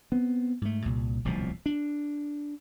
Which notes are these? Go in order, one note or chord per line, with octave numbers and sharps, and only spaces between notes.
B3 C4
G#2 A3
C2 A#2
D1 C2 B2 F3
D4